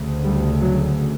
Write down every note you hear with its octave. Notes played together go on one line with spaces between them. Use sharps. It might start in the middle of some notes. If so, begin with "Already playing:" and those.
Already playing: D2 C#3
G3
F#3